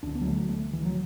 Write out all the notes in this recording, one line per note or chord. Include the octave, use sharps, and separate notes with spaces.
D2 D3 D4
B3
F#3
A3
F#3
A3
E3
F#3